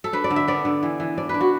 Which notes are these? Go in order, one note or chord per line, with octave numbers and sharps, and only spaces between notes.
A4
D4 B4
D5
D3
E5
B3 D5
D3
E3
E3
D4 D5
D4 B4
F#4